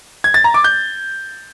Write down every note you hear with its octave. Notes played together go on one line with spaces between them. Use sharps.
G#6
A6
A#5
D6
G6